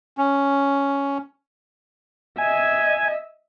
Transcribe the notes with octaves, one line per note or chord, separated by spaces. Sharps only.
C#4
D#5 E5 G#5